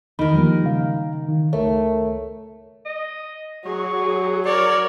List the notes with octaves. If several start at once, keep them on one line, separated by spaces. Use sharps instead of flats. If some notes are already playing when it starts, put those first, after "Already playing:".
E2 D#3 E3 A#4 B5
F3 G3 A#3
C#3 F5
D#3
C#2 A3 A#4 C#5
D#5
F#3 G#4 C#6
A#4 C#5 D5